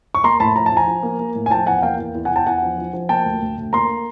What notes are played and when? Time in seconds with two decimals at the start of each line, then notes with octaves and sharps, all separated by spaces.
0.15 C#6
0.23 A#3 A#5 C6
0.40 A2 A5 B5
0.56 F3 A#5
0.66 A5
0.72 F3
0.77 G#5 A#5
0.88 F3
1.03 A#3
1.19 A#3
1.35 A2
1.46 G#5
1.50 F3 G5 A5
1.66 E2 F#5 G#5
1.82 A#3 F5 G5
1.99 E2
2.15 E2
2.25 F#5 G#5
2.31 E2
2.36 G5 A5
2.46 E2 F#5 G#5
2.63 F3
2.78 F3
2.93 F3
3.09 A#3 G5 A5
3.26 D2
3.42 D2
3.57 D2
3.73 A#3 A#5 C6